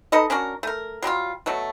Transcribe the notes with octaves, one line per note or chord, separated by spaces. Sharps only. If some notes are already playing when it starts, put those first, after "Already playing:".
D#4 A4 B4 D#5
C#4 D4 F#4 A#4
A3 A#4
F#3 G3 E4 F4
B2 F#3 A3